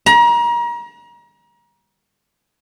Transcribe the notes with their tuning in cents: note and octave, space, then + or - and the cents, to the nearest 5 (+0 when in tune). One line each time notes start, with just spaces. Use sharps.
A#5 +35